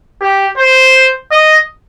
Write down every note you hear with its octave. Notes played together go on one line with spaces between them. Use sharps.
G4
C5
D#5